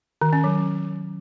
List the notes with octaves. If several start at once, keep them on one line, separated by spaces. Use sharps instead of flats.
D#3
C#4
F#3